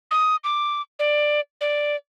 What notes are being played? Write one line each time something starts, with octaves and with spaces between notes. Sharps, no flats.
D#6
D6
D5
D5